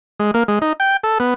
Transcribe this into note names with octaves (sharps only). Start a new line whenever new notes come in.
G#3
A#3
G#3
D#4
G5
A4
B3